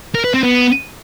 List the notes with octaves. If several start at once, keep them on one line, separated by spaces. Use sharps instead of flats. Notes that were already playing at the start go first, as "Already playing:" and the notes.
A#4
B4
C4
B3